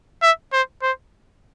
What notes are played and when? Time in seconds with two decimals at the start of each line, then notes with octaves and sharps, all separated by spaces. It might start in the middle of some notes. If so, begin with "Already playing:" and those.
0.22 E5
0.53 C5
0.82 C5